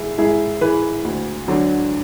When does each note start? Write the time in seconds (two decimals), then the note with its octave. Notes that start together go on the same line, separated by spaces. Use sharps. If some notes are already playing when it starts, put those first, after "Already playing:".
Already playing: G#2 E3 E4 G#4
0.18 G#2 E4 G#4
0.61 E3 G#4 B4
1.04 D2
1.48 D3 F#3